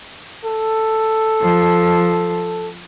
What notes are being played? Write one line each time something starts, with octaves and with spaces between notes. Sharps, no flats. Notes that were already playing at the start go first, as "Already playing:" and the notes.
A4
F3